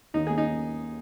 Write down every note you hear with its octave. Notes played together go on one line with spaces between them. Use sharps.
D#2 D#4
A#3 G#4
D#4